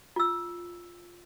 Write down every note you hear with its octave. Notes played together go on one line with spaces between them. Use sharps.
F4 E6